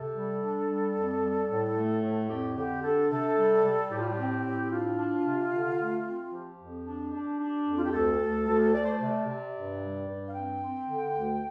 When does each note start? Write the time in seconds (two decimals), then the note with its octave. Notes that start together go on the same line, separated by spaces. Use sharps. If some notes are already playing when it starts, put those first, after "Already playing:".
Already playing: C3 A4
0.15 G3
0.42 D4
0.69 G3
0.95 F2
1.23 G3
1.50 A2
1.76 A3
2.02 A2
2.29 F2 G4
2.56 D3 G4
2.83 D4 A4
3.10 C3 A4
3.37 G3
3.64 G3
3.90 A2 G4
3.99 F4
4.07 G4
4.17 C4
4.45 A2
4.71 D4 F4
4.98 D4
5.24 C3
5.51 D3
5.79 A3
6.05 C4
6.32 F3 G4
6.59 F2
6.85 D4
7.13 D4
7.39 D4
7.66 F2
7.76 F4
7.84 G4
7.93 D2 A4
8.20 D2
8.46 D2
8.73 A3 D5
8.84 C5
8.93 D5
9.00 C3
9.27 C3
9.54 G2
9.81 G3
10.08 G2
10.27 F5
10.34 C4 G5
10.62 C4
10.88 D3
11.15 D2